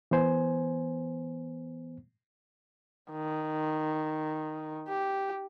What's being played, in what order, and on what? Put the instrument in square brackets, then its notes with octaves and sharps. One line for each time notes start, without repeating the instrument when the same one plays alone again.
[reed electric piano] E3 B3 C5 G#5
[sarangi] D#3
G4